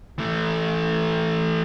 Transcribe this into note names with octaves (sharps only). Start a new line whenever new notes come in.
E3 A3